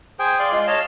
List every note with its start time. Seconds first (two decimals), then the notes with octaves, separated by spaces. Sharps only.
0.19 G#4 C5 G5 G#5
0.39 D5 F5 C6
0.52 G#3 F4 C6
0.67 C#5 D#5 F5 A5